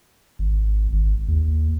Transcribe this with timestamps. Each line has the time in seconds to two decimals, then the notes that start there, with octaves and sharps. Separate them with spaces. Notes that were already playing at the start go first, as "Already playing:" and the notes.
0.39 G#1
0.93 G#1
1.28 D#2